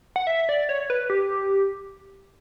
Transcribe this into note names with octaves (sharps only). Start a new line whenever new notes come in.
F#5
E5
D5
C#5
B4
G4